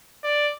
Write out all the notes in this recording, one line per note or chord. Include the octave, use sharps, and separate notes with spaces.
D5